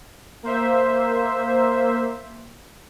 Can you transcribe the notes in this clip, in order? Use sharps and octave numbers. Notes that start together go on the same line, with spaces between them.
A#3 C5 E5